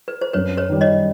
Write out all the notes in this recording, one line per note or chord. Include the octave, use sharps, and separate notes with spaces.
B4
C5
F#2 B4 C#5
B4 C#5
D#3 G3
C#5 D#5